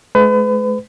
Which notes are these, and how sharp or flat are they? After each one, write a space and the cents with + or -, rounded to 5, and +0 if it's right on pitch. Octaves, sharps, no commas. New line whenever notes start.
G#3 +45 B4 +35